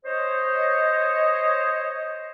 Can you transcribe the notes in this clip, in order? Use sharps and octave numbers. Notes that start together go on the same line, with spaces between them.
C5 C#5 D#5